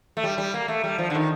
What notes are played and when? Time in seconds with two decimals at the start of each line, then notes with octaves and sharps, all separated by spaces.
0.17 A3
0.24 G3
0.38 G3
0.54 A#3
0.68 A3
0.84 G3
0.98 F3
1.10 D3
1.15 D#3